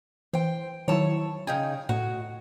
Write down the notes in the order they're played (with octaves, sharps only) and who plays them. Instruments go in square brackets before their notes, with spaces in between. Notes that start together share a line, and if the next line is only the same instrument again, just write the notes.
[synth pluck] E3 [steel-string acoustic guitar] C5 G5
[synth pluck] D#3 F#3 E4 [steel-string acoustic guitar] C#5 A5
[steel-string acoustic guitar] C#3 D#4 G#4 [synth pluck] G5
[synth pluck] A2 [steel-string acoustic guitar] F#4